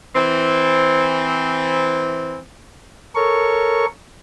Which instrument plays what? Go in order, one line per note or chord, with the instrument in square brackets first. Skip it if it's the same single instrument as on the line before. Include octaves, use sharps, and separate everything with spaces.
[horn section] E3 C4
[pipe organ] A4 A#4 C#5 C#6